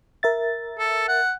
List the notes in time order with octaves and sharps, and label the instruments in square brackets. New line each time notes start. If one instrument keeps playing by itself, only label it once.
[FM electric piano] A#4 E5 A6
[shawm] A4
F#5